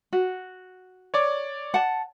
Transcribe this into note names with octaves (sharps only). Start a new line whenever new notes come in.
F#4
C#5 D5 D6
F#5 A5